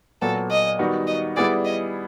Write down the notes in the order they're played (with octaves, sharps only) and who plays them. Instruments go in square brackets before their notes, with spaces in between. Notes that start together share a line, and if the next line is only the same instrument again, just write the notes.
[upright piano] A#2 F#3 B3 [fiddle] A4
[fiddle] D#5
[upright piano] D#3 G3 B3 D#4 F#4
[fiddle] D#5
[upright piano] G3 B3 E4 G#4 [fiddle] D5
[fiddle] D#5